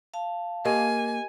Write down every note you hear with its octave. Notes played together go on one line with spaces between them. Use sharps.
F5 A5
A#3 G4 A#4 D#5 G#5